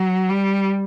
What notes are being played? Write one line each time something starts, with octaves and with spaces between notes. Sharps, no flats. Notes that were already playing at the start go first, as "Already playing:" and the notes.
Already playing: F#3
G3